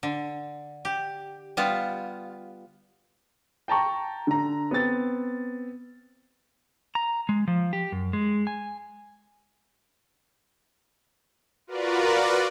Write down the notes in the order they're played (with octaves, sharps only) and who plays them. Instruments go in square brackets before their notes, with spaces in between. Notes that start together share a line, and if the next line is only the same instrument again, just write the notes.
[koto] D3
G4
G3 B3 F4
[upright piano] G5 A5 A#5 C#6
D3 A#5
B3 C4 A6
[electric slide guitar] A#5
G#3
F3
G4
F#2
G#3
G#5
[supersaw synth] F4 F#4 A#4 B4 D5